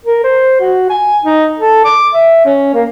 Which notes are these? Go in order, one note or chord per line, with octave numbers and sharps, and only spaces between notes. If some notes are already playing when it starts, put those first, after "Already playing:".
A#4
C5
F#4
G#5
D#4
A4
D6
E5
C#4
A#3